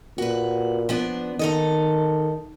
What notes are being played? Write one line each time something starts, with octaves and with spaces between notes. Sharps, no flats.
A#2 F#4 B4
F3 B3 D4
D#3 D#4 A4 D#5